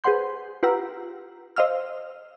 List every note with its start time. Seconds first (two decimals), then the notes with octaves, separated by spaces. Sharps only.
0.04 G#4 B4 C5 F#5 C6 G6
0.63 F4 G4 B4 F#5 A#5 E6
1.56 C5 D#5 F5 E6 F6